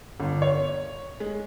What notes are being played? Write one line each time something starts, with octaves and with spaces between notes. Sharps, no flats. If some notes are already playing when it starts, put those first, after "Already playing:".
G1
C#5
G#3